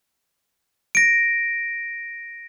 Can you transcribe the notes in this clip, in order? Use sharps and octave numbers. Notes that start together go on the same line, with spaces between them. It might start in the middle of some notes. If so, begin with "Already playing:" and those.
A#6 D7